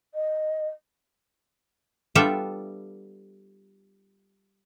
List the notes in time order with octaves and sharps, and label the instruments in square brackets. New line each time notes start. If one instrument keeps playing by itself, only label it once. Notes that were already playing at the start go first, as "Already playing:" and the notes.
[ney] D#5
[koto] G3 B3 D4 F4 A4 E5